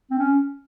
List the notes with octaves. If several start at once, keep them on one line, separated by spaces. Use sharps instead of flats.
C4
C#4